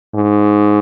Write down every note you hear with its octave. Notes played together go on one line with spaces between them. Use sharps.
G#2